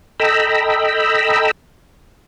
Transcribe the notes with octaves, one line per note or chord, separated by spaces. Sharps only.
A4 D#5 G5 A#5 B5 E6